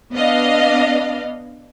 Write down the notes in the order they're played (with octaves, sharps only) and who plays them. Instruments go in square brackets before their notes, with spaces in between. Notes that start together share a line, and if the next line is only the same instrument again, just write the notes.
[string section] B3 D4 D#5 F5